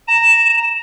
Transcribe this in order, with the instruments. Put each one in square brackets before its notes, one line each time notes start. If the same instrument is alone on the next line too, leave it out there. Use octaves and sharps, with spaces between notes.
[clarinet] A#5 [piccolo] E7